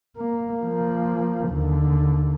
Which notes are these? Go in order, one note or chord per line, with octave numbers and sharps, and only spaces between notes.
A#3
F3 A#3
D#2 D3